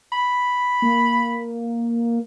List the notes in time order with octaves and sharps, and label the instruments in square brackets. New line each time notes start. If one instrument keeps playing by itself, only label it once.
[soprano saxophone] B5
[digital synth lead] A#3